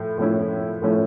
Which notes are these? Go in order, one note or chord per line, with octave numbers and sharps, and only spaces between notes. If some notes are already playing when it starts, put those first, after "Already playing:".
Already playing: A2 F3 A3
A2 F3 A3 C#4 E4
A2 F3 A3 C#4 E4